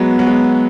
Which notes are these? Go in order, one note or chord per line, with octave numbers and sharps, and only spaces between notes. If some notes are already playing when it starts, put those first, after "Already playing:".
Already playing: F#3 G#3 B3
F#3
G#3